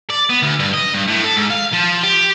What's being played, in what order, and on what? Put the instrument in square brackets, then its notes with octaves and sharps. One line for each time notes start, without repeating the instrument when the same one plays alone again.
[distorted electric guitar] D5
B3
D2
G2
D#5
G2
A2
A4
G#2
F5
F3
G4